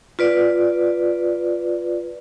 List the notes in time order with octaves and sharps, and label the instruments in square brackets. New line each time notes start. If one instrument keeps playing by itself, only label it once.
[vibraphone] F4 B4 D5